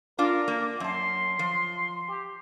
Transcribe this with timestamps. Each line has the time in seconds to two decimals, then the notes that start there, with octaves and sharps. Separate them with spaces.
0.19 D4 F4 A#4 D5
0.48 A#3
0.80 F#2 A5 C6
1.39 F3
2.08 G4